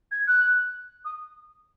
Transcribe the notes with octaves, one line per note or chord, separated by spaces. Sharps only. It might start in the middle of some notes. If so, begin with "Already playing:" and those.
G#6
F#6
D#6